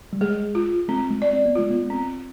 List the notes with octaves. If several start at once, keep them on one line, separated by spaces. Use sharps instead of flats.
G3
G#3 G#4
F4
G#3 C4
G#3
D5
C4
B3
G#3 F4
B3
C4